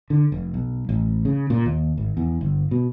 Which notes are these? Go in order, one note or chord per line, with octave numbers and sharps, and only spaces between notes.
D3
F1
B1
A1
C#3
A#2
D#2
G#1
E2
G1
B2